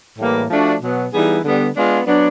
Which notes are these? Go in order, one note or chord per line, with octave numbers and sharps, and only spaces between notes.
A2 E3 G3 A#3
F3 A3 D4 F#4
B2 F#3 B3
E3 G3 B3 D#4 G#4
D3 G3 B3
G#3 B3 D4 F4
F#3 B3 D4